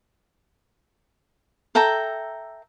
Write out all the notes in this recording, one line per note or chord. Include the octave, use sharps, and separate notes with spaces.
A4 E5 G5 A#5